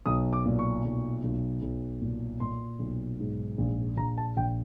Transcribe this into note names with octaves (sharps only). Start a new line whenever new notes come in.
B1 D#6
D6
A#2
C#6
B1
B1
B1
A#2
A#2 C6
B1
G#2
A#1
A#1 A#5
A5
A#1 G5